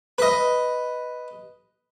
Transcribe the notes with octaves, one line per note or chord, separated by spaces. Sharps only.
B4 D#5